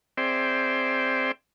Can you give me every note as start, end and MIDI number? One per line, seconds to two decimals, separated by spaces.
0.17 1.32 60
0.17 1.32 68
0.17 1.32 72
0.17 1.32 74
0.17 1.32 76
0.17 1.32 79